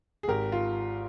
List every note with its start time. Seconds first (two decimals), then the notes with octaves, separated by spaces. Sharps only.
0.23 G#4
0.28 G#1 G4 A#4
0.52 F4